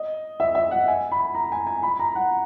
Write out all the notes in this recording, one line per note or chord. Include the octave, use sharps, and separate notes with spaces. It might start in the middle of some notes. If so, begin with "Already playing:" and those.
Already playing: D#5
E5
E5
F#5
G#5
B5
A#5
G#5
G#5
B5
A#5
F#5